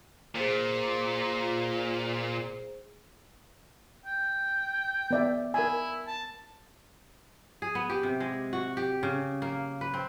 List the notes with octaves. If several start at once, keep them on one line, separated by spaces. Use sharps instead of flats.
A#2 G#4 C5
G5
B3 D5 E5
E4 A#4 G#5
A5
G#4
B3
G4
C3
G#3
F#4
G4
C#3
A#3
B4
C4